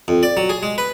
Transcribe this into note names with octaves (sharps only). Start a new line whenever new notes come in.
F2
D5
F#3
G#4
G#3
B4